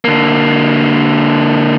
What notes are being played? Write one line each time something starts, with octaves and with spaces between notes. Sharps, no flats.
D3 A#3